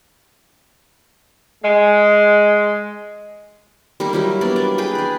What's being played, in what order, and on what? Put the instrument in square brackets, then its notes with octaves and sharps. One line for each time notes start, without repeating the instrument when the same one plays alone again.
[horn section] G#3
[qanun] G3 A#3 D#4 A#4
F#3 G3 E4
A#3 B3 D4 D5
A#3 D5
G#4 B4 G5
D4 D5